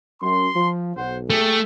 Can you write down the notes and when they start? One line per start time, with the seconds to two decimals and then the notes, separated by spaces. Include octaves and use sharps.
0.22 F#2 C6
0.55 F3
0.97 B1 C5 F#5
1.30 A3 G4 G#4